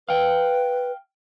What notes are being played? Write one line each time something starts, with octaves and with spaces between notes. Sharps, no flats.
B4 F5 G5